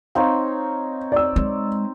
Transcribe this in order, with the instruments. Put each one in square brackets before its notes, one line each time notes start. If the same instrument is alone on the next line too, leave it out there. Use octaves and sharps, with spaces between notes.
[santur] C4 D#4 C#5 [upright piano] F5
[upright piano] D5 E6
[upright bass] G#3